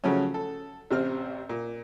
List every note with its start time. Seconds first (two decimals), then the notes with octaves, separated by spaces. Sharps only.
0.04 C#3 F3 F#3 A3 C#4
0.34 A4
0.91 A1 C3 C4 F6
1.49 A#2